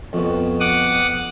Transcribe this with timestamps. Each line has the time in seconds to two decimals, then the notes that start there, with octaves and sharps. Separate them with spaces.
0.13 F2 B2
0.60 F#5 D6 D#6